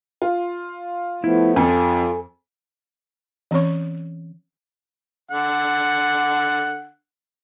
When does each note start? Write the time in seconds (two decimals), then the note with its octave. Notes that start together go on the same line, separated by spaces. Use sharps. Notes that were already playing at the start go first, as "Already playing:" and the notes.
0.22 F4
1.24 F3 A3 B3 E4
1.56 F2 F3 F4 A4 G#5
3.51 E3 C4 C#4 C#5 C#6
5.31 D3 F#5